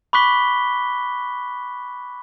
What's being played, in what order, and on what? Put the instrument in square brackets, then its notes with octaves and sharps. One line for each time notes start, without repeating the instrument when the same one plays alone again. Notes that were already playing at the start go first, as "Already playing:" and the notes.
[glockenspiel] B5 C#6 D6 F#6 B6 G7